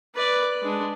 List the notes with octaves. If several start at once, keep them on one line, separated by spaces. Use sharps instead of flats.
B4 D5
G#3 D4